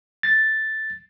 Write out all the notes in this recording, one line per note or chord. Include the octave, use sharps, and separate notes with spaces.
A6